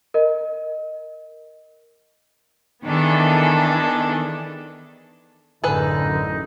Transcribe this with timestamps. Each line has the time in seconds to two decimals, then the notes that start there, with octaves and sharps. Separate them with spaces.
0.14 A#4 D#5
2.84 D#3 E3 B3 D4 G#4 A4
5.64 A1 F#2 D3 D#4 G#4 A4 B4